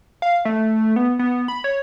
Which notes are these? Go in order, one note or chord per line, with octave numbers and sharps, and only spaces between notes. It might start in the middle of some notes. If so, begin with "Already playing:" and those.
F5
A3
B3
B3
B5
C#5